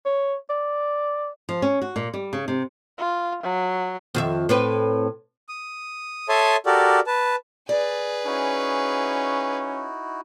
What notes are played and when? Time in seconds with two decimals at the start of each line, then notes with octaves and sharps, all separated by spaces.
0.05 C#5
0.50 D5
1.49 F3
1.62 C#4
1.82 F#4
1.96 A#2
2.14 G3
2.33 C#3
2.48 C3
2.98 F4
3.43 F#3
4.15 F2 D#3 E5
4.49 A2 C4 B4
5.48 D#6
6.29 A4 C#5 E5 A5 C6 D#6
6.66 F#4 G4 A4 A#4 D5
7.07 B4 A5
7.69 G#4 B4 D5
8.26 C#4 D#4 E4 F#4